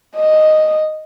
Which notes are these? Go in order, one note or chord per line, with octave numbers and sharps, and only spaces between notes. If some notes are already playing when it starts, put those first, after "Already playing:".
D#5